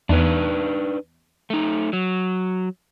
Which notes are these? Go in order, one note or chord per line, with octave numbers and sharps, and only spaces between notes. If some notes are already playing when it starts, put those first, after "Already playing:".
E2 D4 D#4 B4
A3 D#4
F#3